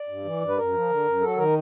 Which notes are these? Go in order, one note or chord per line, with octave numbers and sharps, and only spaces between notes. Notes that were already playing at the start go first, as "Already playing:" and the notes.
Already playing: D5
G2
E3
G2
B4
F#2 A#4
F3
D3
F#2
F#3 A4
D#3 A#4